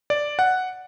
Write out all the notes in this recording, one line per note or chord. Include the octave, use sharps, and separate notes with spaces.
D5
F#5